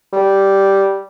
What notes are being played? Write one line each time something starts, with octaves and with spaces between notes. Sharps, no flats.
G3